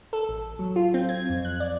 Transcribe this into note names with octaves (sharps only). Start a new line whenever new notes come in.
A4
A1
F#3
F4
C4
G#6
F2
F#6
D5